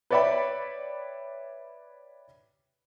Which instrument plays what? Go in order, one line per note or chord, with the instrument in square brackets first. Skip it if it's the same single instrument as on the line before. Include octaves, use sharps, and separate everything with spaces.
[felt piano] B4 C#5 D5 E5 G5 B5